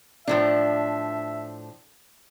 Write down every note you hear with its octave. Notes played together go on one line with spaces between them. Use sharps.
A2 F3 D4 E5